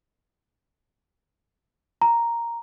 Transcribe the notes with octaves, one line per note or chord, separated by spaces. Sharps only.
A#5